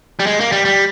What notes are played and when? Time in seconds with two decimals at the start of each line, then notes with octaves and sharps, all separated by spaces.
0.20 G3
0.27 G#3
0.40 A#3
0.52 G3
0.65 G3